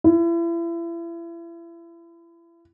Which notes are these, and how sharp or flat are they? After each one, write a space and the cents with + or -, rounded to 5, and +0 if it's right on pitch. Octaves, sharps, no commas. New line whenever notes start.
E4 +35